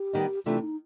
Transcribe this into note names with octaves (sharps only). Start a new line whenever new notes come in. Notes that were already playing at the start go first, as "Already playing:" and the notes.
Already playing: G4
D#3 G3 B3 D#4
C3 E3 A3 D4 F4
D#4